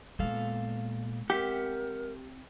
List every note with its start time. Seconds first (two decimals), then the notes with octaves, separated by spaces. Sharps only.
0.19 A#2 G#3 B3 A4 F5
1.30 C4 G4 A#4 E5 F#5